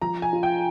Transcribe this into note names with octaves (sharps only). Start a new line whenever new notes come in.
F3 A#5
G#5
F4
G5